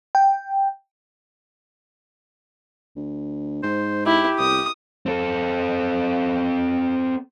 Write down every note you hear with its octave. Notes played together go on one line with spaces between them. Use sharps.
G5
D2
G#2 C5
E4 G4
C2 D#6
C4 A4